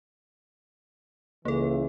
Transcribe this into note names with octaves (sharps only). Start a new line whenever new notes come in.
C#2 E3 A#3 A4